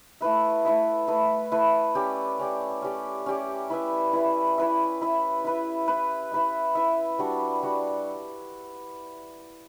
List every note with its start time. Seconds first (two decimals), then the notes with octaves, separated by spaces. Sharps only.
0.21 A3 E4 B4 E5
0.65 A3 E4 B4 E5
1.08 A3 E4 B4 E5
1.52 A3 E4 B4 E5
1.95 C#4 G4 D5
2.39 C#4 G4 D5
2.82 C#4 G4 D5
3.26 C#4 G4 D5
3.70 E4 B4 E5
4.13 E4 B4 E5
4.58 E4 B4 E5
5.01 E4 B4 E5
5.44 E4 B4 E5
5.88 E4 B4 E5
6.32 E4 B4 E5
6.75 E4 B4 E5
7.19 G3 D4 F#4
7.63 G3 D4 F#4